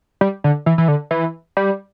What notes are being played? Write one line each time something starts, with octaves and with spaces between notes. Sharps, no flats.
G3
D3
E3
E3
D3
E3
G3